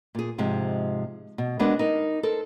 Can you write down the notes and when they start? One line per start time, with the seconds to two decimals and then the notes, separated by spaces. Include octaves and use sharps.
0.15 A#2 G#4
0.38 G#2 C3 F3 G#3
1.38 B2
1.59 G#3 B3 D4 F#4 A#4
1.79 D#4 A#4
2.23 A4 A#4 C5